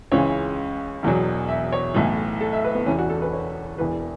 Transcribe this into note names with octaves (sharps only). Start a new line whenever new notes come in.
C#2 C#3 E3 C#5
E1 E2 B2 F#3
E5
C#5
B1 A2 E3
A4
E5
B4
B3
E1 E2 E3 C#4
F#4
A4
B4
C#5
E1 E2 E3 B4